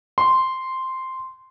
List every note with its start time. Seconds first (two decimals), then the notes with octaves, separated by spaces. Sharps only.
0.18 C6